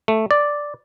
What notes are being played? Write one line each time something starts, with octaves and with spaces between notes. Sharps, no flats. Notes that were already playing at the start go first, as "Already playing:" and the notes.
A3
D5